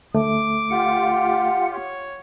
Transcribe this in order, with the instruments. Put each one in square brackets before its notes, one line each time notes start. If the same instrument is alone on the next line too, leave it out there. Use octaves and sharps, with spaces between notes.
[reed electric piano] D2 A3 [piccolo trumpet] D6
[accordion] F4 G4 [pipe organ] F#5
[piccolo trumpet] C#5